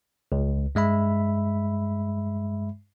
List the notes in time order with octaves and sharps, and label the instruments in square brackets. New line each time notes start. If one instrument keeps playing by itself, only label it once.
[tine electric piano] C#2
G2 G#3 E5 B5